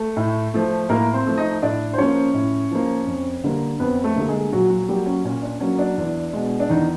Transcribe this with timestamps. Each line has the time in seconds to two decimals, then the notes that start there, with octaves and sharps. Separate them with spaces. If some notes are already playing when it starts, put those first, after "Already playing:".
Already playing: A3 A4
0.17 A2
0.54 F3 A3
0.89 A2 A#3 A#4
1.13 C4 C5
1.26 F3 A3
1.38 D#4 D#5
1.62 A2 D4 D5
1.93 C5
1.98 F3 A#3 C#4 C#5
2.34 A2
2.71 F3 A#3
3.07 F2
3.44 D3 G3 A#3
3.79 F2 B3 B4
4.04 A3 A4
4.16 D3 G3 A#3 A4
4.28 G#3 G#4
4.52 A#2 F#3 F#4
4.70 F#3 F#4
4.88 F#3 G3 A#3 G4
5.06 C#4
5.24 A#2 C#4
5.42 D4
5.60 F#3 A#3 C#4
5.78 D4
5.98 E2
6.33 B2 G#3
6.60 D4
6.69 E2 D#3 D#4